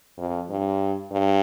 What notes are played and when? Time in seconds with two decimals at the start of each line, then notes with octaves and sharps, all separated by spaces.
0.18 F2
0.49 G2
1.12 G2